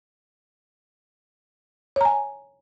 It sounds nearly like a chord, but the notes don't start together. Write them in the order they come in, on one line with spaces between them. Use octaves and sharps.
C#5 A#5 G#5